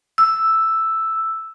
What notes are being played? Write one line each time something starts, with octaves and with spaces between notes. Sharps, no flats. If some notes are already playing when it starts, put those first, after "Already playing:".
E6